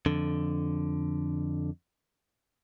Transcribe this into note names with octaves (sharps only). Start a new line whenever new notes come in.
F2 D3